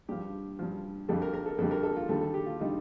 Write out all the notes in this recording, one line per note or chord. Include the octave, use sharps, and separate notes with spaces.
G2 F3 G4
G2 F3
F2 D3 G3 A4
A#4
A#4
A4
F2 D3 G3 A4
A#4
A4
F4
D#2 D3 G3 A4
A4
G4
F4
D3 G3 D#4